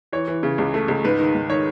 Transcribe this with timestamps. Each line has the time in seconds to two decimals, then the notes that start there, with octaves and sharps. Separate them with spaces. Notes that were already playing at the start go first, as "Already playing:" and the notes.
0.13 E3 C#5
0.28 E3
0.43 C#3
0.58 C#2
0.74 A3
0.88 C#2
1.04 G#2 B4
1.19 D#3
1.34 G#2
1.49 D#3 C#5